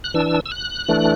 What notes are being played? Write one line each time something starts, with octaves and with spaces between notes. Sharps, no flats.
F#6
E3 D4 E6
E6
F#6
E3 A3 D4